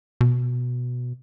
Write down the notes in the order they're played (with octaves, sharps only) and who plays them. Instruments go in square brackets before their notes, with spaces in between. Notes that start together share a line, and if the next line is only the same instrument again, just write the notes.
[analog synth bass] B2